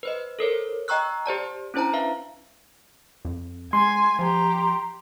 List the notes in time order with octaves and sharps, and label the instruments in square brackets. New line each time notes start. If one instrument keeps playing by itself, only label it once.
[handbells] B4 C5 D#5
A4 A#4 C5 C#5
D#5 G5 A#5 C#6 E6 F#6
G4 C5 D5 A5
C#4 D4 E4 C5 A5 A#5
B4 E5 F5
[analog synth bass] F2
[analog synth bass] G#3 [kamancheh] G#5 [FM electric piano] C6
[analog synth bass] F3 [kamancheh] G4 A#5